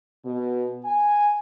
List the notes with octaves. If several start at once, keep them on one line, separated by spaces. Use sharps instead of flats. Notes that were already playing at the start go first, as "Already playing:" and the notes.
B2
G#5